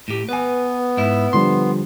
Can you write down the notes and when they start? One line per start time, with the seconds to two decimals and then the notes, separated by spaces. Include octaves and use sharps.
0.08 A2 G4
0.29 B3 B4 G#5
0.97 G#2 E4
1.33 D3 F3 G3 C6